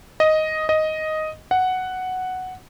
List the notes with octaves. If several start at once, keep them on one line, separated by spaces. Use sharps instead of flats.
D#5
D#5
F#5